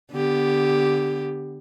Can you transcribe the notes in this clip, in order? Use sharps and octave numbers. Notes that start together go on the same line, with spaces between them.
D3 B3 G4